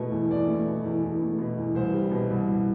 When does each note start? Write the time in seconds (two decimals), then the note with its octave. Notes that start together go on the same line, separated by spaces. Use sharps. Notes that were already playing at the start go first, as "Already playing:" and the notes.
Already playing: E2 B2 A3
0.12 E2
0.30 E2 D5
0.48 A3
0.67 B2
0.84 E2
1.03 E2
1.21 A3
1.38 B2
1.57 E2
1.75 C2 C5
1.94 G3
2.11 B2
2.30 C2
2.48 C2